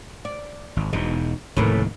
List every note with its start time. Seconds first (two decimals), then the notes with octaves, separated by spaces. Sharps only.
0.25 D5
0.77 G#1
0.93 E1 E2 B2 D#4
1.57 F1 D#2 A2 C#3 E3 A#4